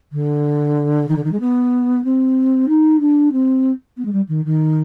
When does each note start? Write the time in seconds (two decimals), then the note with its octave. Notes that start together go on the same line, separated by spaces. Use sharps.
0.12 D3
1.08 D#3
1.16 D3
1.24 D#3
1.32 G#3
1.40 B3
2.04 C4
2.68 D#4
3.00 D4
3.32 C4
3.97 B3
4.05 G#3
4.12 G3
4.28 D#3
4.45 D#3